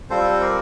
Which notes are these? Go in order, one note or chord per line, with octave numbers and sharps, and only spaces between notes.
G3 C4 F4 A4 C5
A#4 D5